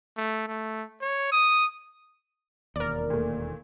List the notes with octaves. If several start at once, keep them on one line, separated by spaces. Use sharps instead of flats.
A3
A3
C#5
D#6
E1 D#2 A#4 D5
A#2 A3